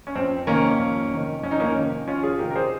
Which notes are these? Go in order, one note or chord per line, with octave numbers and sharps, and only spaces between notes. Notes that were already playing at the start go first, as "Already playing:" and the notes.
C#4
F2 C4
C3 D#3 A#3 C#4
F2
C3 D#3
F2 C#4
D#4
A#3 C#4
C3 D#3
F2 C#4 F4
F4 G#4
C3 D#3 G4 A#4
A#4
G#4 C5